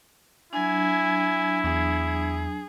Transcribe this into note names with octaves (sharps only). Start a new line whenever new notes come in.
F#3 D4 E4 G#5
E2 G#4